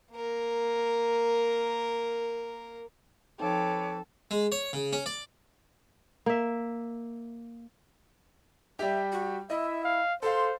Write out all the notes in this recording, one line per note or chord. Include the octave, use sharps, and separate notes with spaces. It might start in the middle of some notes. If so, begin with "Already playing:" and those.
A#3 A#4
F3 C4 D#4 A4 B4 C#5 D6
G#3
C#5
C#3
C#4
D5
A#3 E5
G3 G4 E5
F#4
E4 D#5 E5
F5
A4 C5 F5 C6